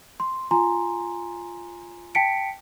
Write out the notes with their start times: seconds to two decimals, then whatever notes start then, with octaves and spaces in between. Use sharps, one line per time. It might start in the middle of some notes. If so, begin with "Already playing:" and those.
0.20 C6
0.51 F4 G#5 A#5 C6
2.15 G5 A5 B6 C#7 D7